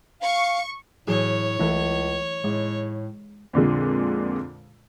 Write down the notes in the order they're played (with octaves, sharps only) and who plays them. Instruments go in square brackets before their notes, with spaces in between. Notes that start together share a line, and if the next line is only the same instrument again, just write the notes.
[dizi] F5 [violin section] C#6
[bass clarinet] A2 [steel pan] E3 F#3 G#4 [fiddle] C#5
[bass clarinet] C#2 [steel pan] E3 A3 E4
[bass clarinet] A2 [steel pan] G#3
[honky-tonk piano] F2 A#2 D3 G#3